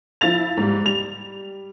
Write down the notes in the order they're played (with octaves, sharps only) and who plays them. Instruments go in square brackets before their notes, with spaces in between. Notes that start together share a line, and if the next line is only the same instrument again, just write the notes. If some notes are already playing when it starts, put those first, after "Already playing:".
[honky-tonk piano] F3 E4 F5 A6 F7
G#2 G3
G3 F7